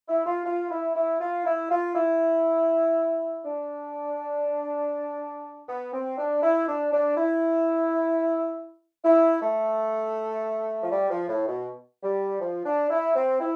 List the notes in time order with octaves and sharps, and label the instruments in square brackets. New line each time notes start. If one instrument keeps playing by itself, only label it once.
[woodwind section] E4
F4
F4
E4
E4
F4
E4
F4
E4
D4
B3
C4
D4
E4
D4
D4
E4
E4
A3
F3
G3
F3
A2
B2
G3
F3
D4
E4
C4
E4